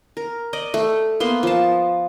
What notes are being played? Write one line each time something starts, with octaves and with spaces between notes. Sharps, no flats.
A#4
D5 D#5
A3
A#3 B3 C6
F3 A5